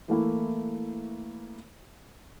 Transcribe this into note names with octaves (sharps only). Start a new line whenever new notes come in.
E3 A3 A#3 E4